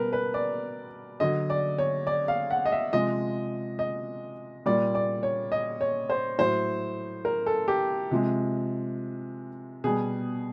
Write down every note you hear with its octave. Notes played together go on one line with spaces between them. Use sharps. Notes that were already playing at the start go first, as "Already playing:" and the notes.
Already playing: B2 G3 A#4 B4
B4
D5
D3 F#3 D#5
D5
C#5
D5
F5
F#5
D#5
E5
C3 F3 G#3 D#5
D#5
A#2 G3 D5
D5
C#5
D#5
C#5
C5
A2 F#3 C5
A#4
A4
G4
C3 F3 G#3
B2 G3 G#4